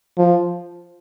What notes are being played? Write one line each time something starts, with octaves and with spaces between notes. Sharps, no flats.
F3